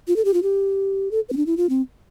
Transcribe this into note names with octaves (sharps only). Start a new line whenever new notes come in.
F4
A4
G4
F4
G4
A4
B4
C4
D4
E4
F4
C4